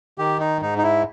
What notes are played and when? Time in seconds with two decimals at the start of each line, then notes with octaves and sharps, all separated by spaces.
0.18 D#3 G4
0.40 D#4
0.62 G#2 D#4
0.78 D#4
0.83 E4